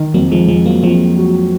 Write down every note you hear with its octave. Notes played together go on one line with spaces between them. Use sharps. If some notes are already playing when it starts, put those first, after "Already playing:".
Already playing: D#3
F2 F#3 A#3
F3 G#3
F2 F3 G#3
F#3 A#3
F2 F3 G#3
F#3